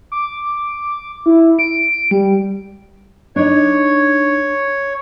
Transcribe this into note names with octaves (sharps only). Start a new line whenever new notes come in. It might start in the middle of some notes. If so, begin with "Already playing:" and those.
D6
E4
D7
G3
D4 D#4 C#5